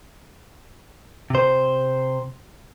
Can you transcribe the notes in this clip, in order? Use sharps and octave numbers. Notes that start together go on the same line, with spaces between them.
C3 C5